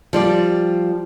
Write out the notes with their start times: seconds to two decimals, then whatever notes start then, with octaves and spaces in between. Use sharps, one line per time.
0.13 F3 G3 D5